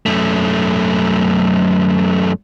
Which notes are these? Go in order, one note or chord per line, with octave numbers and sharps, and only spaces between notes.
F#2 A3